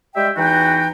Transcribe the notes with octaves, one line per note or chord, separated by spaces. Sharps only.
G3 G#3 G4 E5 G5
E2 E3 D#4 F#4 B4 G5